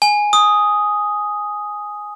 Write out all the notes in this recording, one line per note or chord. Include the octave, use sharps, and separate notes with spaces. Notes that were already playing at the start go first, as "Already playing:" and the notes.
G#5
D#6